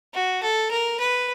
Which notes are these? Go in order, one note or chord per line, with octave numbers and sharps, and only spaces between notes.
F#4
A4
A#4
B4